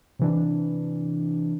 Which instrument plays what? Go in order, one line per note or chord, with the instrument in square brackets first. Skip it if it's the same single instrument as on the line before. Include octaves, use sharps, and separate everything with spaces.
[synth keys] C3 E3 D4